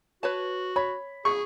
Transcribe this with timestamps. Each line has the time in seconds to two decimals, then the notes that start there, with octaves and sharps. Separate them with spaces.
0.23 F#4 B4 C#5 A5
0.76 C#5 B5
1.25 G#4 C#6